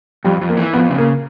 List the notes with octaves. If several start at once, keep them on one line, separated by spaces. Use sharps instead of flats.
F2 G3
F2
A#3
E3
F2 B3
C#3
A#3